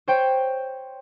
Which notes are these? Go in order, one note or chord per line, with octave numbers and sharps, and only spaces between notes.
C5 C#5 G5